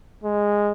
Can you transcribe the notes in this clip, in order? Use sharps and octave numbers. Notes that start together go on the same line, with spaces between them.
G#3